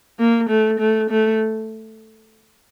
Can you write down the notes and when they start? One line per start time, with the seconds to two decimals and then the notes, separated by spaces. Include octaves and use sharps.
0.19 A#3
0.49 A3
0.79 A3
1.10 A3